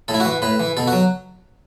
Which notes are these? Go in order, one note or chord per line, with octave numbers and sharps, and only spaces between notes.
A2 A4
E4
F#4
E3
A2 B4
E3
B2 A4
F#4
F#3